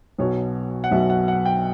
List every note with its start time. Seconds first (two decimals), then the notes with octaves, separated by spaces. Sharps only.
0.19 B1 B2 F#3 C#5
0.84 F#5
0.91 B1 B2 F#3 E5
1.10 F#5
1.28 F#5
1.45 G5